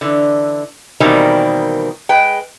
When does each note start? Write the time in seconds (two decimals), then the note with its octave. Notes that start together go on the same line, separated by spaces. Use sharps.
0.01 D3 E3
1.00 B2 D#3 E3 G3 A#3 C4
2.09 G#3 B4 G5